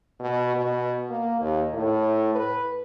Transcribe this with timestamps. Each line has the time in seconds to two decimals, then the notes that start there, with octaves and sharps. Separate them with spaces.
0.20 B2
0.57 B2
1.10 A#3
1.41 D#2
1.73 A2
2.35 B4